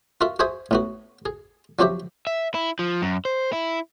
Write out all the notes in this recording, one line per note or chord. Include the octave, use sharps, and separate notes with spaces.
F4 F#4 A#4 E5
F#4 G#4 C5 E5 G#5 D#6
A2 B3 F#4
G#4
F3 F#3 C4 F#4 G4 E5
E5
E4
F3
F#2
C5
E4